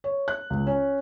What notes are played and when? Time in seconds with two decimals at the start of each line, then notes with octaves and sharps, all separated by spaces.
0.04 C#5
0.28 F#6
0.50 C#2
0.67 C#4